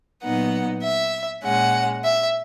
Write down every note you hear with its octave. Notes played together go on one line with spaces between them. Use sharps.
A#2 F#3 B3 D#4 F#5
E5
A#2 G#3 C#4 F#5
E5